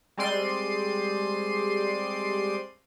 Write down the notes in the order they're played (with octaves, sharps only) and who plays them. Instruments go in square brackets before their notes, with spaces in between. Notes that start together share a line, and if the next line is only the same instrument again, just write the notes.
[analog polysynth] G3 G#3 C4 D5 C6 D#7